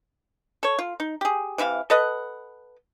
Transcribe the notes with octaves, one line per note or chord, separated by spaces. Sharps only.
A4 C#5
F4
D#4
G4 G#4
C3 E3 E5 F5
A4 B4 D#5 F#5